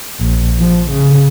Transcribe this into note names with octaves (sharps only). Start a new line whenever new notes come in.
A#1
F3
C#3